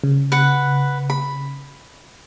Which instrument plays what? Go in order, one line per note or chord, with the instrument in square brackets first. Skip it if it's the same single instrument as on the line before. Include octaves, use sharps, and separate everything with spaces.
[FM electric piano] C#3
[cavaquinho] B4 F#5
B5